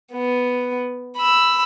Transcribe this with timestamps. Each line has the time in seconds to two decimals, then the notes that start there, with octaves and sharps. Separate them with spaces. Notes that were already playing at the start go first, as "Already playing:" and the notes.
0.13 B3
1.17 B5 E6